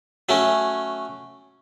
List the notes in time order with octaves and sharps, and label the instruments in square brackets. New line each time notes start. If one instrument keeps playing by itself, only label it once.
[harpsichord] F#3 A3 C#4